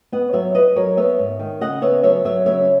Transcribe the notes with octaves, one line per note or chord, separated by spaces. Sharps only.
B3 D#5 F#5
F#3 C#5 E5
B3 B4 D#5
F#3 A#4 C#5
B3 C#5 E5
G#2
D#3
C#3 D#5 F#5
B3 C#5 E5
F#3 C#5 E5
F#3 C#5 E5
C#3 C#5 E5